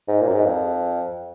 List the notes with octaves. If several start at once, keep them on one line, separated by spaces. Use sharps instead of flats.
G#2
A#2
F#2
G#2
F2